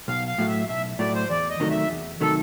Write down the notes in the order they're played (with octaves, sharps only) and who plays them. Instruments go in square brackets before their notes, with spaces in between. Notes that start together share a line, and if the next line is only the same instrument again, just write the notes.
[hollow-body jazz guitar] B1 [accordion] F5
[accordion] F5
[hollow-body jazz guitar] A2 F#3 A3
[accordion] E5
[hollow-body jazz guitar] B1 [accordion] E5
[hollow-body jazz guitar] A2 F#3 A3 [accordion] D5
[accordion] C5
[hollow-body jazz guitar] E2 [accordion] D5
[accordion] D#5
[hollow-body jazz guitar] C3 D#3 F#3 A3
[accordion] E5
[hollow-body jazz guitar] E2
[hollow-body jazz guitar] C3 D#3 F#3 A3 [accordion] A4